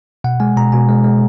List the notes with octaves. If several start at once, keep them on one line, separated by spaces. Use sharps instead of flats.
B2 F#5
G#3 G#5
B2 A#5
B2 G#5
G#3
G#3